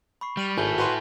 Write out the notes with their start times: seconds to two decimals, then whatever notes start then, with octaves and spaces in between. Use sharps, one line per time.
0.21 B5 C#6 C7
0.37 G3 F6 D#7 F7
0.58 G#1 E4 A4 G#5 G6
0.78 F#4 B4 C6